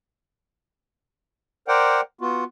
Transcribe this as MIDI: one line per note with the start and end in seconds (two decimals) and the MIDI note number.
1.68 2.01 70
1.68 2.01 72
1.68 2.01 74
1.68 2.01 78
1.68 2.01 79
2.21 2.44 59
2.21 2.44 65
2.21 2.44 66